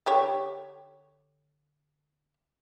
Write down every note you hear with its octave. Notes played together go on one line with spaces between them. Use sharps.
D3 G4 C#5